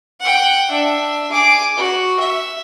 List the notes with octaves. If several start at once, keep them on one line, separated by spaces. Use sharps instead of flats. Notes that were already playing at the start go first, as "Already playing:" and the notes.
F#5 G5
D4 E5
G#4 D6
F#4
E5